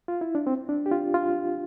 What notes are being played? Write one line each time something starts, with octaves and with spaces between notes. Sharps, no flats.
F4
E4
D4
C4
D4
G4
F4
F4